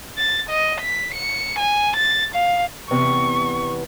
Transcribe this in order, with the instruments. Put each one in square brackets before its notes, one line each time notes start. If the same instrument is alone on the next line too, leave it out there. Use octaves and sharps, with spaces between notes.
[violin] A6
D#5
B6
C#7
G#5
A6
F5
[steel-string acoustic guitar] E2 C3 B3 [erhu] C#6